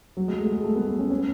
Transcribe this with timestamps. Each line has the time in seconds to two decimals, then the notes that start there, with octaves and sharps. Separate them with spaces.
0.17 F#3
0.28 G#3
0.41 A3
0.52 G#3
0.64 A3
0.76 B3
0.87 B3
0.99 C#4
1.10 C#4